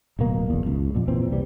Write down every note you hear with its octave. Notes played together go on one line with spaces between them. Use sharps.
D1 B2 A#3
F#1 E2
C#2
F2 A#2
A#2 E3 C4
C2 E3 G3